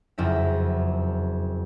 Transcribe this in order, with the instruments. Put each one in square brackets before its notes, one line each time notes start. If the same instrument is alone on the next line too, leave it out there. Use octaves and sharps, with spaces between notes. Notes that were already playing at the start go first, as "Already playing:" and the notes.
[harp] F#1 F2 E4 E5